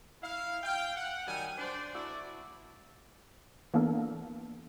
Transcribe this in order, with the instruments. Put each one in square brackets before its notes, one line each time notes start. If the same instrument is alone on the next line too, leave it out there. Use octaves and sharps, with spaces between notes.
[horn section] E4 F5
F5 G5
F#5
D#3 F#3 G3 G5 G#5
D4 C5 D5
A3 D4 E4 F#4 D5
[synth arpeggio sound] E3 A#3 B3 D4 A4 A#4